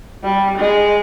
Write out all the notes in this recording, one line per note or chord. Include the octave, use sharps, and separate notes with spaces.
G3
G#3